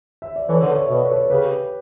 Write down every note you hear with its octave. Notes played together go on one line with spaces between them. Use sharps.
E5
D5
E3 A4 C#5
D3 B4 D5
C#5 E5
B2 B4 D5
B4
A4 C#5
C#3 G4 B4